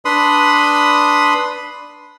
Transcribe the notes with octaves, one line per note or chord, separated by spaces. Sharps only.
D4 B4 B5 C6 D#6